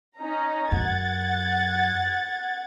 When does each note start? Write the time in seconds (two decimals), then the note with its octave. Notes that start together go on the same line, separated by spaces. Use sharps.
0.18 C#4 D#4 A#5
0.72 F#2 F#5 G#6 A6